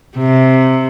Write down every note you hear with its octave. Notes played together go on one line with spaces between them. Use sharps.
C3